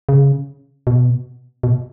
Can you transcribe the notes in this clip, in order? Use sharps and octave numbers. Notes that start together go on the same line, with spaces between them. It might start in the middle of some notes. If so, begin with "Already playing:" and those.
C#3
B2
B2